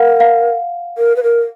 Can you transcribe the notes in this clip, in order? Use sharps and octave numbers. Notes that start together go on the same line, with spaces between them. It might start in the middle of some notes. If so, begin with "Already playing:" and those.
Already playing: A#4 F5 F#5
F5
A#4
B4
A#4